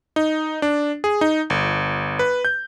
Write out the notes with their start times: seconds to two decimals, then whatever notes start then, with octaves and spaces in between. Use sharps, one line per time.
0.16 D#4
0.62 D4
1.04 G#4
1.21 D#4
1.50 G1
2.19 B4
2.45 G6